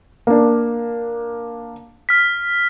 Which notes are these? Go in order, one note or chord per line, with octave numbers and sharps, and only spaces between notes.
A#3 D4
F6 B6